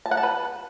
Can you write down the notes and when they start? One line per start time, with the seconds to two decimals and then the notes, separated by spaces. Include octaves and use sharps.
0.06 A5
0.11 F#5
0.17 A5
0.23 B4